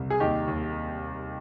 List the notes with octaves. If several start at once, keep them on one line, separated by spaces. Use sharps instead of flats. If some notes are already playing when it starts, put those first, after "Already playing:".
Already playing: C2
G#4
D#2 D#4 G4
D#2